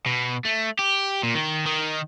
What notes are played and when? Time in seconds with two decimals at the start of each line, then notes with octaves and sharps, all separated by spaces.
0.06 B2
0.45 A3
0.79 G4
1.23 A#2
1.35 D#3
1.66 D#3